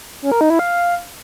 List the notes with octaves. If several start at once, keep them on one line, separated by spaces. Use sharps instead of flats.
C#4
A#4
D#4
E4
F5